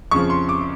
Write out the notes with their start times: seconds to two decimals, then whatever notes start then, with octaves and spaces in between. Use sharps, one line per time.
0.11 F2 C#3 F3 C#6
0.30 C6
0.49 D6